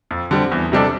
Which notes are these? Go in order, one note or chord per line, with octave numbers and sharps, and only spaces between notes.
F2
D3 G3 C4
E2
C3 G3 D4 A4